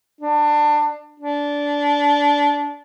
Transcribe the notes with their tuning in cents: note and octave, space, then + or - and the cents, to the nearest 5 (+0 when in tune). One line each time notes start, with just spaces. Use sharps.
D4 +20
D4 -20